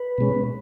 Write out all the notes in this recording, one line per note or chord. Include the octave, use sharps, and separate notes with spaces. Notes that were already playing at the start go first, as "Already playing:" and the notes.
Already playing: B4
B2 G#3 C#4